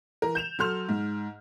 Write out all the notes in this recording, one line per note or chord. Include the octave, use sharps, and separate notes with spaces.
E3 A#4
G6 E7 F7
F#3 A4 C6 F6 F7
G#2